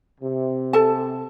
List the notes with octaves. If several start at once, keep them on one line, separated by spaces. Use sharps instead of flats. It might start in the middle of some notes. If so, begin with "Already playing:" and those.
C3
A4 A5